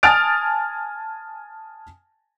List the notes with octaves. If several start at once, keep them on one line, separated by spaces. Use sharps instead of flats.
G#5 A5 D#6 F6 A6 D7